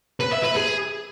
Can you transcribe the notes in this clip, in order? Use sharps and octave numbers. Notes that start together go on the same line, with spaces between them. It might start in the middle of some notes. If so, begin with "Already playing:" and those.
B4
E5
B4
G#4